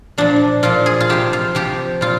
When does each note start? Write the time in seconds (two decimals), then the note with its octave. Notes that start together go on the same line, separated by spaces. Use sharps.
0.18 A#2 F3 D4
0.63 A#2 F3 F4
0.86 G#4
1.00 F4
1.09 C3 F3 G4
1.33 F4
1.55 C3 F3 G4
2.01 A#2 F4